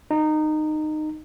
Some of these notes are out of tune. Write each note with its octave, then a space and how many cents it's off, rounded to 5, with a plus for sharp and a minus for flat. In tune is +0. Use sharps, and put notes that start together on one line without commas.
D#4 -20